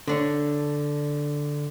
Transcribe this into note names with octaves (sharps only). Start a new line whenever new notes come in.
D3 D4 C#5